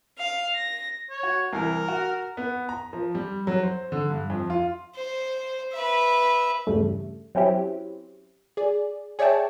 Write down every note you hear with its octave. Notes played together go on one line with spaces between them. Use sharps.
F5
A#6
C#5
F#4
C2 E3 A#4
F#4
B3
A#5
F3
G3
F#3
C5
D3
G2
F2
F4
C5
B4 E5
E2 G2 C#3 G3 A3
F#3 C4 C#4 E4 G4
G#4 D5
G#4 C#5 D5 E5 G5 A5